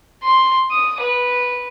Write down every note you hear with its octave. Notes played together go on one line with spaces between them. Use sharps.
C6
D#6
B4